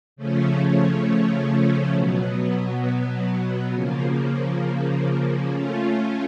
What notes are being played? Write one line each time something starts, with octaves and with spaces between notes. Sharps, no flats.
C#3 F3 A3 C#4
B2 F#3 B3
C#3 F3 A#3
A3 C#4 F4